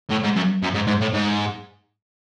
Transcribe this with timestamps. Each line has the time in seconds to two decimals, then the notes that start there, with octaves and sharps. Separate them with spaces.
0.10 A2
0.23 G#2
0.36 F#2
0.62 F#2
0.74 G#2
0.87 G#2
1.01 A2
1.13 G#2